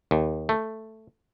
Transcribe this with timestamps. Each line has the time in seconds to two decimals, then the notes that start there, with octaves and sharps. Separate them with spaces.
0.11 D#2
0.49 A3